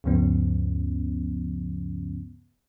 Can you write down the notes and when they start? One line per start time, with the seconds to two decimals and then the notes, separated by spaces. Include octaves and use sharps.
0.04 D2 G2 C#3 F3 B3 C#4